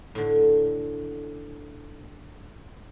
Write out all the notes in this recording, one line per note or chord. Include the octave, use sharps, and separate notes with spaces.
A2 D3